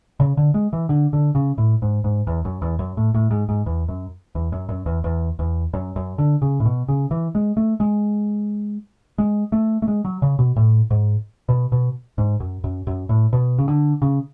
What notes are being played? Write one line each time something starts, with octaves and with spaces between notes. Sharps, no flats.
C#3
D3
G#3
E3
D3
D3
C#3
A2
G#2
G#2
E2
F#2
E2
F#2
A2
A2
G#2
G#2
E2
F#2
E2
F#2
F#2
E2
E2
E2
F#2
F#2
D3
C#3
A2
B2
C#3
E3
G#3
A3
G#3
G#3
A3
A3
G#3
F#3
C#3
B2
A2
G#2
B2
B2
G#2
F#2
F#2
F#2
A2
B2
C#3
D3
C#3